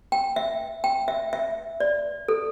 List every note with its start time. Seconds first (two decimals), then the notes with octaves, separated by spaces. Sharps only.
0.12 G5
0.36 E5
0.84 G5
1.08 E5
1.33 E5
1.80 D5
2.28 A4